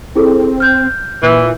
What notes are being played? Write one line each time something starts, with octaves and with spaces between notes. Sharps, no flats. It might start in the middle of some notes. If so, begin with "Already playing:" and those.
C4 E4 G#4 A4
F6 G6
A#2 E3